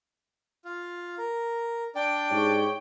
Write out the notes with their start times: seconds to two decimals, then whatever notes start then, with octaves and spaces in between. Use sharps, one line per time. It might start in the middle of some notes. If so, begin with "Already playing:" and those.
0.65 F4
1.18 A#4
1.95 D4 D5 G5
2.31 G#2 G4 C#5